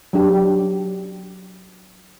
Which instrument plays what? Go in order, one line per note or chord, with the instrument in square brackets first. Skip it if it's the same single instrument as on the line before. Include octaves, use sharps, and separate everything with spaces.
[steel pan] F#3 D4 G4